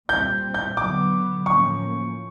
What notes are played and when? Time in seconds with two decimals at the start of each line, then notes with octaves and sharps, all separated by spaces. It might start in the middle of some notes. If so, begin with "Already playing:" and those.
0.09 A#2 G3 C4 G6
0.54 G6
0.77 D3 F#3 B3 D6
1.45 A2 F3 A#3 C#4 C#6